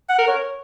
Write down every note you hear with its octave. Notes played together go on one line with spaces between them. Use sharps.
F#5
A#4
C#5